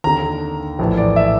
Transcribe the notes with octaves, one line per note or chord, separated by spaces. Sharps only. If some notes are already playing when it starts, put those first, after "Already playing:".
D#2 D3 A#5
A#1 A2 E3
D5
E5